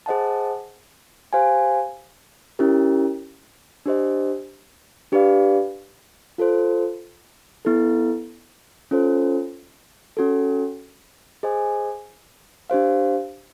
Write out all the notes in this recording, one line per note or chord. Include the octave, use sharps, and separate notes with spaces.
G#4 C5 D#5 F#5 A5
G4 C5 F5 G#5
C#4 E4 G4 A#4
D4 G4 C5 D#5
D4 G4 B4 D5 F5
F4 A4 C5
B3 E4 A4
C#4 F4 A4 C5
C#4 F#4 A4
G#4 C5 D#5 G#5
D4 G4 C5 F5